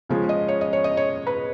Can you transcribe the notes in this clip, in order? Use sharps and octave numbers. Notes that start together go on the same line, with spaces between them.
C#3 F3 G#3 C#4
D#5
C#5
D#5
C#5
D#5
C#5
B4